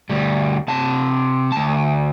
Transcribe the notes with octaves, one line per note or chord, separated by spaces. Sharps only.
D2 G3
C3 A5
D2 A5